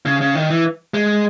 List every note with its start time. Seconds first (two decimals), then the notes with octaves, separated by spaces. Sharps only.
0.06 C#3
0.21 C#3
0.35 D#3
0.50 E3
0.94 G#3